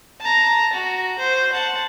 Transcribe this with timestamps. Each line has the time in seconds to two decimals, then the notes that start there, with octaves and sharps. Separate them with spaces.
0.20 A5 A#5
0.73 F#4
1.19 C5
1.53 F#5 A5